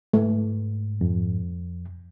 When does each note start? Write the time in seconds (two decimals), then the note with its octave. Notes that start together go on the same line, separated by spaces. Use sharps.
0.13 G#2 A3
1.01 F2